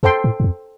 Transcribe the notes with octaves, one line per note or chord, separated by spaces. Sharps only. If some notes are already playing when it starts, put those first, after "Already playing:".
F2 A4 C5 G5 C6
A2
G2
F2